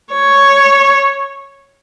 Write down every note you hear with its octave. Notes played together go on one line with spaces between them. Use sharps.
C#5